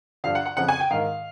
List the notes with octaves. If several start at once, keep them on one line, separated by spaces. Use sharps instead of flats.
G2 D3 F3 F5
F#5
F#5
F2 C#3 F3 F#5
G#5
G5
G#2 D#3 F5